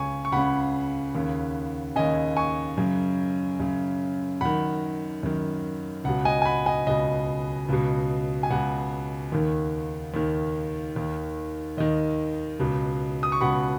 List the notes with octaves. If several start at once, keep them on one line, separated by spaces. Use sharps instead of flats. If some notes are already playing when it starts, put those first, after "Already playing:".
Already playing: C#2 C#3 G#5 C#6
C#6
C#2 C#3 F#5 B5
D#2 C#3
D#2 C#3 D#5 G#5
G#5 C#6
F#2 C#3
F#2 C#3
F#2 D#3 F#5 B5
F#2 D#3
C#2 B2 F#5
D#5 G#5
G#5
F#5 B5
D#5 G#5
C#2 B2 D#5
C#2 B2
G#5
C#2 B2 F#5
D#2 D#3
D#2 D#3
D#2 D#3
D#2 D#3 D#5
C#2 B2
D#6
C#6
C#2 B2 F#5 B5